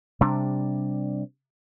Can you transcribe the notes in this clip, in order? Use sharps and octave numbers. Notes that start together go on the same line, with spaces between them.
C3 G3 D4